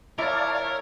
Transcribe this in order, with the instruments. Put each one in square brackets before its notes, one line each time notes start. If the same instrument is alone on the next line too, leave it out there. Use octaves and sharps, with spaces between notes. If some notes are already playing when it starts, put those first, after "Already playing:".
[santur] E4 [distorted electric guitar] A#4 [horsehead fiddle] C#5 [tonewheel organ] D5 F5 A5